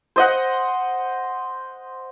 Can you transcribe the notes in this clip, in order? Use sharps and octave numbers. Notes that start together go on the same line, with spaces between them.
C5 D#5 F#5